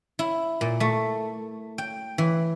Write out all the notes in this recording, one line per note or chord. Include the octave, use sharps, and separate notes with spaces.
E4
A#2
A3
G5
E3